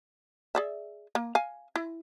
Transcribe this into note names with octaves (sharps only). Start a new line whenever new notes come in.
G#4 D5 E5
A#3
F5 G#5
E4